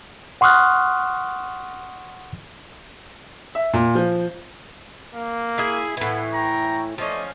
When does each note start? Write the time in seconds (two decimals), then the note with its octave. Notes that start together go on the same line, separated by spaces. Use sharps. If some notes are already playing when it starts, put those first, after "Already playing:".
0.41 F#5 C6 C#6 D#6 F6 F#6
3.55 E5
3.73 A#2
3.95 F3
5.15 A#3
5.58 E4 G#4 E5
5.97 A2 E3 B3
6.32 G5 A#5 C#6
6.98 F3 A3 C#4 D5 D#5